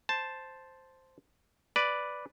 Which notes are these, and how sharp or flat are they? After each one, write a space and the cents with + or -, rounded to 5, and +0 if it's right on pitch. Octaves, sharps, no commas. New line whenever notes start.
C5 +0 A5 +0
B4 +0 D5 +0